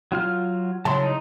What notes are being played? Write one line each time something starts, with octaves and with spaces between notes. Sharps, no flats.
F#3 F4 F6
C#3 F#3 E4 A5 C6
D#4